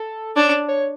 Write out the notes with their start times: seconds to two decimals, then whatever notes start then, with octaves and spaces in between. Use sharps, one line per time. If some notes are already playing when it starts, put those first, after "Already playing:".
Already playing: A4
0.36 D4 C#5
0.68 C#5